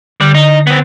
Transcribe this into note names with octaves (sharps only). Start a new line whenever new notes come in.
D3 G3
D#4
B3 C4